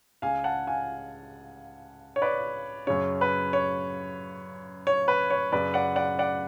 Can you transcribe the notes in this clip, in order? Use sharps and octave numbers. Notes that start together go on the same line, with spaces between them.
C#2 C#3 F5 G#5
F#5 A5
F5 G#5
C#5
B4 D5
F#2 C#3 C#5
B4
C#5
C#5
B4
C#5
F#2 C#3 B4 D5
D5 F#5
D5 F#5
D5 F#5